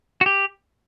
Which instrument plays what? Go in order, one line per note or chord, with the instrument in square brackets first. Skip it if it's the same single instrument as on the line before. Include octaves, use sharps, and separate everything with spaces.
[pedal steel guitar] F#4
G4